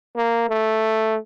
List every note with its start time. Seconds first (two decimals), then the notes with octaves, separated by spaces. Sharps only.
0.16 A#3
0.49 A3